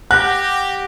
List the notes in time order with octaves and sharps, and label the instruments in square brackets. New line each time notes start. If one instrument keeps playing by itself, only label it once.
[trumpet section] G4 [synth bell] F#5 A#6 [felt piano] F#6